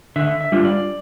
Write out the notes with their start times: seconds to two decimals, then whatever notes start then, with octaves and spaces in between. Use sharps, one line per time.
0.16 D3 E5
0.41 E5
0.52 G3 D4 F4
0.65 D5